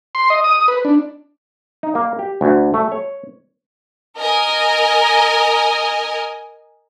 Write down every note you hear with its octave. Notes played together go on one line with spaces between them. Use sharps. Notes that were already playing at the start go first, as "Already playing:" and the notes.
C6
D#5
D#6
B4
D4
D#4
A#3
G4
D2
A3
C#5
A#4 D#5 G#5